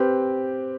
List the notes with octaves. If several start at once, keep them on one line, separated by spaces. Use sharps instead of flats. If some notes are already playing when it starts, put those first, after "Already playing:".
Already playing: C4 G4 B4